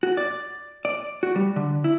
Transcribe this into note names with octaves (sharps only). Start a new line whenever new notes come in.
F#4
D5
D5
F#4
G3
D3
E4